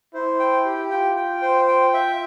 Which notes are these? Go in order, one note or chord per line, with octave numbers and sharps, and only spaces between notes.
E4 C5
G5
G4
F4 G5
G5
C5
G5
E5